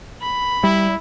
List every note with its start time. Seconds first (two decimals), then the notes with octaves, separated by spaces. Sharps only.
0.22 B5
0.64 G3 E4